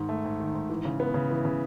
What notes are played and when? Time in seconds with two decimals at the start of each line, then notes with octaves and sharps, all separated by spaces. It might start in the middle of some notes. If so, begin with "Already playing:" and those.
Already playing: G#2 D#3
0.09 A3
0.25 G#2
0.40 D#3
0.54 G#2
0.70 E3
0.85 C#3
1.00 B3
1.14 C#3
1.30 E3
1.45 C#3